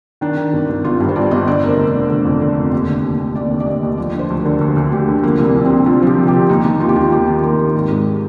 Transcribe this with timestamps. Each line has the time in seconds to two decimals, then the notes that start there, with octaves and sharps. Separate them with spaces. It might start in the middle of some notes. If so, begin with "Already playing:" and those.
0.21 D#3 D4
0.37 D#3
0.53 G1
0.69 G1
0.85 G1 F4
1.00 G2
1.09 C5
1.16 G2 D5
1.31 G1 D#5
1.47 D3 D5
1.63 F1 A#4
1.68 C5
1.78 F1
1.95 D3
2.09 D3
2.25 F2
2.41 D3
2.57 F1
2.72 D#2
2.88 D3
3.04 D#2
3.20 D#2
3.35 D#2 D5
3.51 D3
3.60 D5
3.67 D#2 D#5
3.83 D#2
3.97 F3 D5
4.14 D3
4.19 C5
4.30 D2
4.40 A#4
4.45 D3
4.61 D2
4.76 D2
4.92 D2 G4
5.08 D3
5.23 F3 A#3
5.39 C2
5.45 A#3
5.55 C2
5.65 C2 C4
5.86 F3 F4
6.02 F3 G4
6.18 C3
6.28 G4
6.33 C3
6.49 D#2 D#4
6.64 D#2
6.80 D#2 F4
6.89 G4
6.96 D#2 F4
7.12 D#2 G4
7.27 D#3
7.43 D#2 A#4
7.59 D#3
7.75 G#1
7.91 G#2